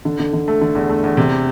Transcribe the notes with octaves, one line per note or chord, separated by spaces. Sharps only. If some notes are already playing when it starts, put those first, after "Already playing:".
D3
D3
D3
A3
D3
E2
A3
E2
C3